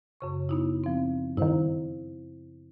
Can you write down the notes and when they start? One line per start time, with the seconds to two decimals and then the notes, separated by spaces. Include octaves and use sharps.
0.21 F#2 C#3 C#6
0.49 B3 D#4 E4
0.84 F3 C4
1.37 G2 D#3 E4 C5 F5